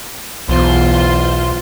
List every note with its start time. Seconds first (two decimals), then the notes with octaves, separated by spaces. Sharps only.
0.49 B1 E2 F4 C5